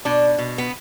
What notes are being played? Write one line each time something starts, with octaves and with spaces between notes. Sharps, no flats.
B2 D4
B2
B3